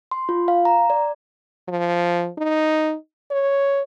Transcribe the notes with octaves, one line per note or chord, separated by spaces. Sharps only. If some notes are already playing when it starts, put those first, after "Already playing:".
C6
F4
F5
A#5
D5
F3
D#4
C#5